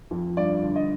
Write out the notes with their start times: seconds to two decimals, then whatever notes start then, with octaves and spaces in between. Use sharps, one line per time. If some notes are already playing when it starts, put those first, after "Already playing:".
0.11 F2
0.37 G2 D5
0.63 D3
0.76 D#5